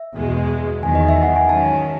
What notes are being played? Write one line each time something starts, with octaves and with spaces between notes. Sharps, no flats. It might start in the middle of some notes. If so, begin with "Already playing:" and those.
Already playing: E5
E2 B2 G#3
E2 D#3 F#3 G#5
D#5
E5
F#5
G#5
G#2 D#3 F#3 C#4 A5